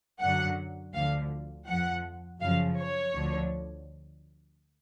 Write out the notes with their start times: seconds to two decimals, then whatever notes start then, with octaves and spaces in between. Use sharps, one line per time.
0.20 F#2 D3 F#3 F#5
0.94 D2 D3 F3 F5
1.67 F2 F3 F#5
2.40 F#2 C#3 F3 F5
2.78 C#5
3.14 D2 D3 F3